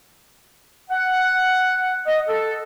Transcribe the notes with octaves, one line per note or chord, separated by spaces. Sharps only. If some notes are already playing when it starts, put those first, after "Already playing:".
F#5
D#5
A4